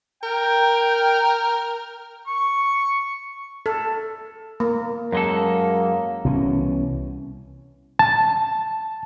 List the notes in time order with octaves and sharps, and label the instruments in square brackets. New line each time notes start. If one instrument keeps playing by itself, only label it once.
[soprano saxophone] A#4 [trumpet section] G5
[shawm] C#6
[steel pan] A4
A#3
[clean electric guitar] F#2 G#3 A4 [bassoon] A#3
[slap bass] C2 B2 E3 C#4
[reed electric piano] A5